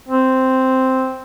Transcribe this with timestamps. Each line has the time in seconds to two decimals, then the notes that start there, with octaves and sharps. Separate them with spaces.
0.09 C4